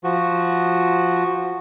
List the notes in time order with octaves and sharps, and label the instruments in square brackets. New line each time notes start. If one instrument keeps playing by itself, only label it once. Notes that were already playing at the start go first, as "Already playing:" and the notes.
[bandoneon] F3 F#4